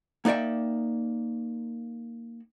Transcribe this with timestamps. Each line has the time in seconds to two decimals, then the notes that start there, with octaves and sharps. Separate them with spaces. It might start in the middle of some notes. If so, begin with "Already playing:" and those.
0.25 A#3 D#4 D5 E5 G5